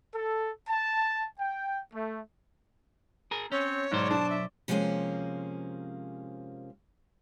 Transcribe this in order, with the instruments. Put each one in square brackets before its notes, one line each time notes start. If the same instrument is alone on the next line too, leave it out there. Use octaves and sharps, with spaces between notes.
[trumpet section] A4
A5
G5
A3
[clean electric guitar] G#4 A#4
[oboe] C4 [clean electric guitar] C#4 [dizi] C#5
[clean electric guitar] B1 F#3 C5 [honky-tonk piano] G#2 [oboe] D5
[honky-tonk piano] D4 [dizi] A5
[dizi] E5
[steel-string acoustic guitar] C3 F3 G3 G#3 A#3 C#4